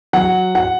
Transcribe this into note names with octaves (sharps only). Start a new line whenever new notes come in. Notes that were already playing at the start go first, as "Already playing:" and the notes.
F#3 F#5
F#5